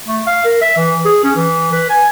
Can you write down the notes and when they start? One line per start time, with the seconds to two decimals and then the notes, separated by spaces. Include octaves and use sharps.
0.07 A3
0.27 F5
0.45 A#4
0.61 E5
0.77 E3
1.05 G#4
1.24 C#4
1.36 E3
1.72 B4
1.90 G#5